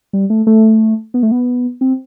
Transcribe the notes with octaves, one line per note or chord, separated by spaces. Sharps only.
G3
A3
A3
B3
A3
B3
C4